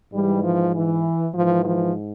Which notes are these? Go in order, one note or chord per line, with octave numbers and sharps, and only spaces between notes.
G#2 E3 G3
F3
E3
G#2 E3 F3
F3